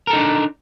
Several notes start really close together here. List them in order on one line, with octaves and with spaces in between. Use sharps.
A#4 A4 D#4 D4